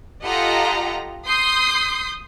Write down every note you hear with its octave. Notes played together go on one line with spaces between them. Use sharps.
F4 G4 A4 D#5 F#5 A#5
C6 D#6 G6 C7